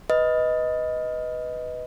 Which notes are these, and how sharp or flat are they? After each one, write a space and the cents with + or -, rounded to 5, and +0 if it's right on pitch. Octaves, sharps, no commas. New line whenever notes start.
B4 +5 D#5 +10